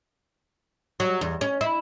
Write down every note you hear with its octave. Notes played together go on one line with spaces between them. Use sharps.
F#3
E2
C#4
E4